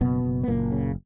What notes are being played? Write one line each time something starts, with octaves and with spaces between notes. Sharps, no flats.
F#1 B2 B3
F#1
B3
F#1 A#2 A#3
C#3